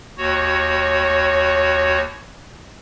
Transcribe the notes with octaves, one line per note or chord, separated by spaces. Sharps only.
D#2 F#4 C#5